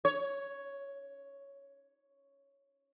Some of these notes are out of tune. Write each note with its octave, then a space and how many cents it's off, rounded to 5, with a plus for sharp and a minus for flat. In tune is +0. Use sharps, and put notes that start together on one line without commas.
C#5 +5